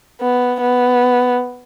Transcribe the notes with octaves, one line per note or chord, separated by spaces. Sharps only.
B3
B3